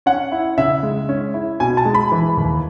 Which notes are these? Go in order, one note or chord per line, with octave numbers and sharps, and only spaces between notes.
C#4 F#5
E4
C#3 E5
G#3
C#4
E4
B2 G#5
A5
G#3
B5
E3
D#2